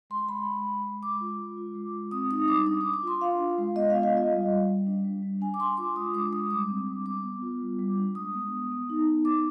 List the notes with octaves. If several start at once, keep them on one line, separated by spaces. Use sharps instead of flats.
G#3 C6
G#3 B5
G#3
G#3
G#3
G#3 D6
F4
G#3
F4
G#3
G#3
C4 D#6
D#4 D#6
G3 D6
D4 D#6
D6
D4
D6
F4 C6
F4 F5
D4
G#3
B3 D#5
F5
F4
F5
F4 D#5
G3
G3
G3
D4
G3
G3
D4 G#5
D6
D4 C6
F4 D6
G#3 D#6
G#3 D6
D4 D#6
G3 D6
C4
G3
B3 D6
B3
F4
G3
G3
D4
G#3 D#6
B3
B3
B3
D#4
D#4
B3 D6